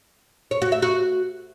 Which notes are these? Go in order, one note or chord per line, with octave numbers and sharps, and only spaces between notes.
C#5
F#4
E5
F#4